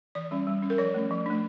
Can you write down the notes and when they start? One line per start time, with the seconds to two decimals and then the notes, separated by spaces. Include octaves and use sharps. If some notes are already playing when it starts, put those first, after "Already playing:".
0.15 E3 D5
0.31 G3 C#4
0.47 G3
0.62 C#4
0.70 A#4
0.78 F3 C#5
0.94 A3 C#4
1.11 F3
1.26 A3 D4